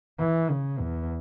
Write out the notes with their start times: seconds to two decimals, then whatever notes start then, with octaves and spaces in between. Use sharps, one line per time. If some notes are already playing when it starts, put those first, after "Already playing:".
0.19 E3
0.50 C#3
0.80 E2